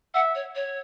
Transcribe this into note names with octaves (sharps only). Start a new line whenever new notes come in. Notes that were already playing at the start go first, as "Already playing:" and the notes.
E5 F#5
C#5
C#5